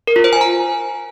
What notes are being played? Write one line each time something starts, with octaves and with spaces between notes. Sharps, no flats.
A#4
F4
C5
G#5
A#5